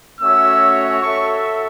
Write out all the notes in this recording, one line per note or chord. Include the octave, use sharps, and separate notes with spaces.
A3 C#4 F#4 C#5 E5 E6
F#4 A4 E5 C#6